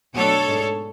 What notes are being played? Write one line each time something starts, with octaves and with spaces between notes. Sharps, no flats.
B2 F#3 A3 D4 A4 C#5
G#2 G#3 D4